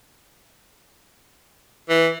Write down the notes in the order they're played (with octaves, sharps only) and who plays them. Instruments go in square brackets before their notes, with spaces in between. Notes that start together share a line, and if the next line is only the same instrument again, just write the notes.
[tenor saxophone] E3